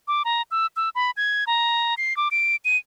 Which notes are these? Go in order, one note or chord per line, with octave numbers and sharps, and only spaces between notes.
D6
A#5
E6
E6
B5
G#6
A#5
C7
D6
D7
D#7